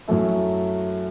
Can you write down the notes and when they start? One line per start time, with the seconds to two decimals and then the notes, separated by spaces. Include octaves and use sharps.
0.08 F#2 F#3 A3 E4